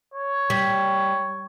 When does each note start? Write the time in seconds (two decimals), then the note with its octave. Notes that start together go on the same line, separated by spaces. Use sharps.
0.14 C#5
0.50 G3